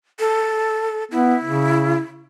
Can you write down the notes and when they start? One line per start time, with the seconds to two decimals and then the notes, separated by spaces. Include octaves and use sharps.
0.20 A4
1.11 B3 E4
1.44 C#3